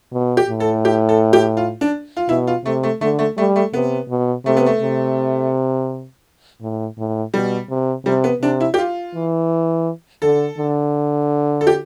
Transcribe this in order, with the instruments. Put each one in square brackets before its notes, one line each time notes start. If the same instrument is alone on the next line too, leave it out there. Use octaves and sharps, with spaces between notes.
[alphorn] B2
[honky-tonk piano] G4
[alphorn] A2
[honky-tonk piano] A4
G4
A4
G4
F4
D4
F4
[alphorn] B2 [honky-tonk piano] E4
[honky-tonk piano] F4
[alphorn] C3 [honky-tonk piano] A3
[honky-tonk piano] A3
[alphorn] D3 [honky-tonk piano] A3
[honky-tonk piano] A3
[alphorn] G3 [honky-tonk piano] A3
[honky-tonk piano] A3
[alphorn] C3 [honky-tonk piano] B3
[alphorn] B2
[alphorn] C3 [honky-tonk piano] A3
[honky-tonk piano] B3
A3
[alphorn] C3
A2
A2
[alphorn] B2 [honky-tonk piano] G3
[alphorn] C3
[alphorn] C3 [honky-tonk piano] G3
[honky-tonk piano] B3
[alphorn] C3 [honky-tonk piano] D4
[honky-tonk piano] E4
G4
F4
[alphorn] E3
[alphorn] D3 [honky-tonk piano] A4
[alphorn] D3
[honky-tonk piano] A4
G4